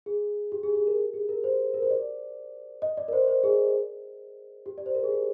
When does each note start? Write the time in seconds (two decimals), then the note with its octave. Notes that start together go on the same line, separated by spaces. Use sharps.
0.06 G#4
0.52 G4
0.63 G#4
0.75 G#4
0.87 A#4
0.99 G4
1.14 G#4
1.29 A#4
1.44 C5
1.74 A#4
1.82 C5
1.90 D5
2.82 D#5
2.97 D5
3.08 A#4
3.13 C5
3.28 C5
3.44 G#4
4.66 G4
4.78 D5
4.86 C5
4.95 A#4
5.04 G#4
5.12 G4